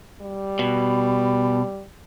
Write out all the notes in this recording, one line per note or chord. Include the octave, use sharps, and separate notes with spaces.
G3
B2